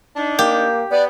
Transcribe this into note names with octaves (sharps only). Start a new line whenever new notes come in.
D4 D#4
A#3 G4
B3 D5